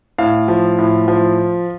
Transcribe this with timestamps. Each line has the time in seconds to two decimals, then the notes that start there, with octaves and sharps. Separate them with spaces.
0.18 A2 F5
0.48 F3
0.78 A2
1.08 F3